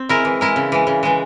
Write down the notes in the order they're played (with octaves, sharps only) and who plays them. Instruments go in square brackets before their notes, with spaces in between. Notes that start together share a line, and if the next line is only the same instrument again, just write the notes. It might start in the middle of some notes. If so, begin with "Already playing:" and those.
Already playing: [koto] C4
G#3 E4 A#4
E3
G#3 E4 A#4
C#3
E3 G#3
C#3
E3 G#3